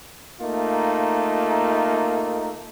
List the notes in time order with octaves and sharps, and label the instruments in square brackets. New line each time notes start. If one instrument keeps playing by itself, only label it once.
[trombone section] A3 A#3 D#4 F4